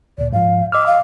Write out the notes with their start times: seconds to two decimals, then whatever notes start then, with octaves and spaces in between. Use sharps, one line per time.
0.18 D2 A#2 D5
0.32 G#2 F3 F5
0.72 D#5 D6 E6 F6
0.86 F5